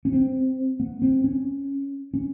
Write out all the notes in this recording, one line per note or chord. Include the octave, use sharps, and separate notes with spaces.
C#4
C4
B3
C4
C#4
C#4